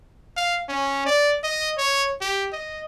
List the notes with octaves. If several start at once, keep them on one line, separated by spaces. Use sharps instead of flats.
F5
C#4
D5
D#5
C#5
G4
D#5